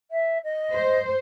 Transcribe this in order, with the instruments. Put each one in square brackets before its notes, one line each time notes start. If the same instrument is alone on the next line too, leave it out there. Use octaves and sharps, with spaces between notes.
[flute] E5
D#5
[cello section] C5